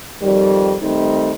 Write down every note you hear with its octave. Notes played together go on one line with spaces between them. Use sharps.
F2 D#3 G3
D#3 G3 A3 C4 D#4